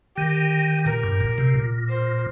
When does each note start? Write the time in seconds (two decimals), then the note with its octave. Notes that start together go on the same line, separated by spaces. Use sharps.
0.17 D#3 G4
0.86 A#2 A#4
1.03 G2
1.20 A#2
1.38 C3
1.54 A#2
1.89 C5